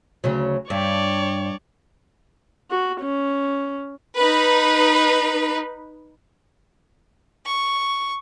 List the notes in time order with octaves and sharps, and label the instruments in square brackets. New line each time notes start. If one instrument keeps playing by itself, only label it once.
[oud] D2 C#3 F#3
[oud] G2 [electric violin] C#5 D5
[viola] F#4
C#4
[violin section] D#4 B4
[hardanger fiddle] C#6